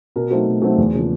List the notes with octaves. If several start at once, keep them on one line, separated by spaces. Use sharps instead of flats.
B2 A#4
F#3 A3 C4 D#4 C5
B2
F#3 A3 C4 D#4
E2
C#3 F3 A#3